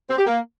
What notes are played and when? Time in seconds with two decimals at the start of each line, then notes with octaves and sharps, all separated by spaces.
0.10 C4
0.18 G4
0.26 A#3